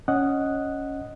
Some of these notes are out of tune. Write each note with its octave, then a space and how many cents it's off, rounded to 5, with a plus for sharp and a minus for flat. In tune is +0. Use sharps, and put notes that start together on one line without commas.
C#4 +0 D#5 +0 F#5 +0